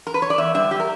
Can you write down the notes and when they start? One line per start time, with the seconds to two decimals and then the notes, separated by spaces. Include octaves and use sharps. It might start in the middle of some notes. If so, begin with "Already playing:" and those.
0.07 A#4
0.14 B4
0.22 C#5
0.30 D5
0.38 E2 E5
0.54 D3 G3 E5
0.71 G4
0.80 A#4